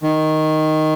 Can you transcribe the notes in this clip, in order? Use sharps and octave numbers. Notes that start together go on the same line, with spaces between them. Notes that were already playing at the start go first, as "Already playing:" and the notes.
D#3